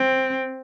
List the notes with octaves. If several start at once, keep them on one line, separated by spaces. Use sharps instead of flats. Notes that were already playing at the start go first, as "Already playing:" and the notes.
Already playing: C4